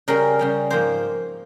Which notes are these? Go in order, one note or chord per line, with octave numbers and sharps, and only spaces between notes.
C#3 G3 C#4 A#4
C#3 G3 C#4
G#2 F3 A#3 C5